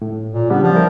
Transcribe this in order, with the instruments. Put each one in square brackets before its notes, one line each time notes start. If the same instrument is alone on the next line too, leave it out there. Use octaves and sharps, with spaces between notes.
[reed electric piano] A2
[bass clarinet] A#2
[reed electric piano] C#3 G3 D4 [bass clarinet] B3
[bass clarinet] F3
[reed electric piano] E4 A#4